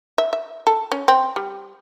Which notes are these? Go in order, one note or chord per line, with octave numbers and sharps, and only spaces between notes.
E5
E5
A4
C#4
C4
G3